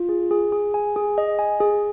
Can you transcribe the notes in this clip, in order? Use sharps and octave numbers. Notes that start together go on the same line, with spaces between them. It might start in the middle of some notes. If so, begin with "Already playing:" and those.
Already playing: F4
G#4
G#4
G#4
G#5
G#4
D#5
G#5
G#4